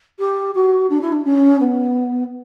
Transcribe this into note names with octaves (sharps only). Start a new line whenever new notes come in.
G4
F#4
D4
E4
D4
C#4
B3